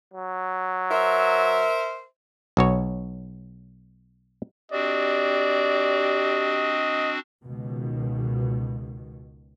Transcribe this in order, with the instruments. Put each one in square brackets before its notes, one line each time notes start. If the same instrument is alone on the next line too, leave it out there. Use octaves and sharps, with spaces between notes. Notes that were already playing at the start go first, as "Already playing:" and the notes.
[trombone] F#3
[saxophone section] A#4 C5 E5
[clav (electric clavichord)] B1 F#4 C#5
[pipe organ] C4 D4 F#4 [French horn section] G4 [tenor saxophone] D5 [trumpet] D#5
[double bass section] C#2 B2 D#3